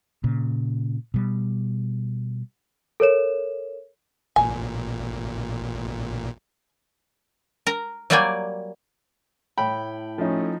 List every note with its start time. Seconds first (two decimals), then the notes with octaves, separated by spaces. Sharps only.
0.24 A#2 C#3
1.14 B2 G3
3.00 A4 A#4 C#5 E7
4.36 A1 A#2 G#5
7.67 A#4 A#5
8.10 F#3 G3 A#3 D5 G5 G#5
9.58 A2 G5 B5
10.18 F3 A3 C#4 D#4